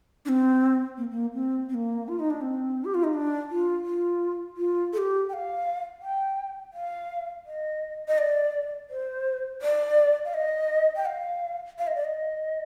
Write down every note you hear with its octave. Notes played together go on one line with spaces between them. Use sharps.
D4
C4
A#3
A#3
C4
C4
A#3
F4
D#4
D4
C4
G4
F4
D#4
D4
F4
F4
F4
A4
G4
G5
F5
G5
F5
D#5
D#5
D5
C5
D5
F5
D#5
G5
F5
F5
D#5
D5
D#5